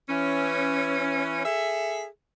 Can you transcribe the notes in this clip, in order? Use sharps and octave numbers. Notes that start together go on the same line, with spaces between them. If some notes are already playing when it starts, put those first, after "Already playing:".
E3 C#4
G#4 A4 E5